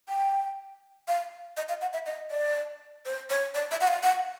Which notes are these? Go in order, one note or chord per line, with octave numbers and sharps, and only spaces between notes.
G5
F5
D#5
F5
F#5
E5
D#5
D5
C5
C#5
D5
E5
F#5
F5
F#5